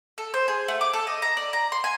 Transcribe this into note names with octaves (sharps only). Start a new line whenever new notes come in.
A4
C5
G#4
A3
D6
A4
D#5
A#5
D5
A#5
C6
G#5